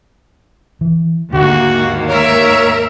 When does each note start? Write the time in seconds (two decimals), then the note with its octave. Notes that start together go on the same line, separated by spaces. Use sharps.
0.81 E3
1.33 D#2 G#2 D3 A#3 F#4
2.09 A#4 C#5 E5